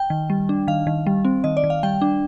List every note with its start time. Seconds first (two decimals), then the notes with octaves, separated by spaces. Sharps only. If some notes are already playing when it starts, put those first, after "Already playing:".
Already playing: G5
0.10 D#3
0.30 G3
0.49 D4
0.68 D#3 F5
0.87 D#3
1.06 G3
1.25 C4
1.44 D#3 D#5
1.57 D5
1.64 D#3
1.70 F5
1.83 G3 G5
2.01 D4